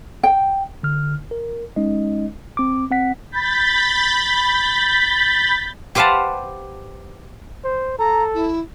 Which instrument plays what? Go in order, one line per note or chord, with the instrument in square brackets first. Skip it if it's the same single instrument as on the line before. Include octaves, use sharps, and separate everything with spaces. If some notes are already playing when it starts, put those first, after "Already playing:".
[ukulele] G5
[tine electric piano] D3 F6
A#4
G#3 C#4 D#4 D#5
C4 D6
C4 F#5 B6
[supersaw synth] B5 G6 A6 B6
[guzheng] G4 B4 C5 F5 F#5 A5
[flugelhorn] C5
[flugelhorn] A4 [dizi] A#5
[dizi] E4